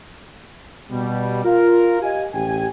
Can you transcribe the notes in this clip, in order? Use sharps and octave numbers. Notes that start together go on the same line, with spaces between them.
B2 G3
F4 A#4
G4 D#5 F5 G#5
A1 G4 G5 G#5